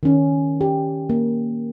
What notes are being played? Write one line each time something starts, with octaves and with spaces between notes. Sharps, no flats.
D#3 C#4
G4
A#3